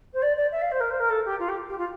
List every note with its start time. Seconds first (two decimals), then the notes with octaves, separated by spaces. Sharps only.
0.13 C5
0.22 D5
0.36 D5
0.51 E5
0.61 F5
0.71 C5
0.80 A#4
0.90 C5
0.99 A#4
1.09 A4
1.24 G4
1.39 F4
1.48 G4
1.68 G4
1.78 F4